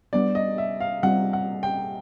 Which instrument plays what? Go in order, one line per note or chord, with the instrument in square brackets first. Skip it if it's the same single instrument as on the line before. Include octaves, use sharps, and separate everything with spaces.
[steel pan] G3 B3 D4 [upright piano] D5
[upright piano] D#5
E5
F5
[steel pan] G3 C4 F4 [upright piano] F#5
[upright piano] F#5
G5